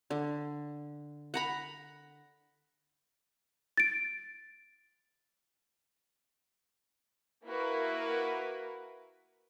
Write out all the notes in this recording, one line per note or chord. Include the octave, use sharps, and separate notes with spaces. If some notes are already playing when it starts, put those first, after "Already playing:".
D3
F#5 A#5 B5
A6 D7
A#3 E4 F#4 A#4 B4